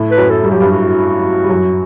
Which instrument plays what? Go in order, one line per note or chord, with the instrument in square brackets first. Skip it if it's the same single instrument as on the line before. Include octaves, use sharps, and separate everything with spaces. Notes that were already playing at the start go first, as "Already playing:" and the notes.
Already playing: [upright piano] A2 A3
[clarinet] B4
[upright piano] F#2 F#3
[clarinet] A4
[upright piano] G3
[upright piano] F#3 [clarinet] G4
[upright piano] G2 G3
[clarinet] F#4
[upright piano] G3
F#2 F#3